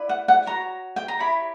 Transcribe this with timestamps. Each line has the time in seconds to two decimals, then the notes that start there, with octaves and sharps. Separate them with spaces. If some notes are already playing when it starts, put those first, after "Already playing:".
Already playing: E4 B4 D5
0.09 F#5
0.28 F#5
0.46 F#4 C#5 A#5
0.96 G5
1.08 A#5
1.19 E4 G4 C#5 B5